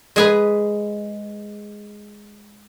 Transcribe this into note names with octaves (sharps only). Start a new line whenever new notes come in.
G#3 G#4 B4